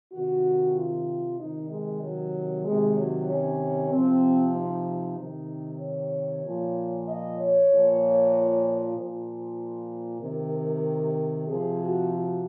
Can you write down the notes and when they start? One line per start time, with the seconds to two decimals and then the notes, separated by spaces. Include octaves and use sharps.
0.13 C3 D#3 F#4
0.76 F4
1.39 C3 D#3 D#4
1.70 G#3
2.01 F#3
2.64 C3 D#3 G#3
2.96 F#3
3.27 C#4
3.91 C3 F3 C4
4.54 D#4
5.17 C3 D#3
5.79 C#5
6.42 A#2 F3
7.06 D#5
7.37 C#5
7.68 A#2
7.73 F3
8.95 A#2 F3 C5
10.21 C3 D#3 A#4
11.47 C3 F3 G#4
11.78 F#4
12.10 F#4